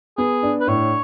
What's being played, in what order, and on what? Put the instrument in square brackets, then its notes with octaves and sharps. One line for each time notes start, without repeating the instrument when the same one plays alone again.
[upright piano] B3 [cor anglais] G#4
[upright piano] D4
[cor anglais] B4
[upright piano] A2 [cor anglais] C#5